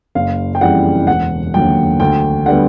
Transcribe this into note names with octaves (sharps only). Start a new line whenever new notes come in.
F#1 F5
G5
F2 C#3 E3 G3 F#5
E1 F#5
D#2 D3 F#3 G5
D2 G5
D3 G3 B3 F#5